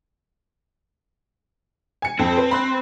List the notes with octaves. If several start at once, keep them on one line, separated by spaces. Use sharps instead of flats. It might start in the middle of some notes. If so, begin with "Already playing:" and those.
G#5 C#7
F2 C4
B4
B5 C6 F#6